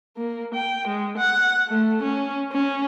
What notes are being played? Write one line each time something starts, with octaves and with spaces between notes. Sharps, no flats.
A#3
G5
G#3
F#5
A3
C#4
C#4